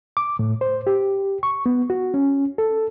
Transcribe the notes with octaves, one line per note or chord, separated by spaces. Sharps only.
D6
A2
C5
G4
C#6
B3
F#4
C#4
A4